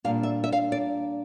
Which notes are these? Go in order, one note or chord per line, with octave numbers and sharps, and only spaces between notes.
A#2 G3 D4 F5
E5
E5
F5
D5